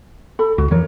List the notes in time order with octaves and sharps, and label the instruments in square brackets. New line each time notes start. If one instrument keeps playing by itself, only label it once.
[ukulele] A4 B5
[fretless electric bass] C#2 [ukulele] F#4
[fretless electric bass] F2 E3 F3 [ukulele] A#4 C#5